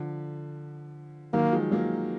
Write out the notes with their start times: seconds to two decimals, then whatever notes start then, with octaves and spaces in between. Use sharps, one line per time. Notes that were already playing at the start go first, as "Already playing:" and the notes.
Already playing: D3 F3
1.33 D#3 F#3 A#3
1.52 F3 G#3
1.71 F#3 A#3